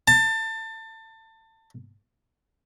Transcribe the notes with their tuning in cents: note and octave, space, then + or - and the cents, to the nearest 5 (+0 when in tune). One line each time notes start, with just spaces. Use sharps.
A5 +25